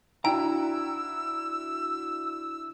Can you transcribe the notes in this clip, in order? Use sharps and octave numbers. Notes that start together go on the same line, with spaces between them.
D4 E4 F#4 G5 A#5 E6